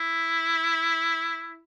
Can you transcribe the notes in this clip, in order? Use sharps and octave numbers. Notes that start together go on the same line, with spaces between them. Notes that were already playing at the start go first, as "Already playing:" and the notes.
Already playing: E4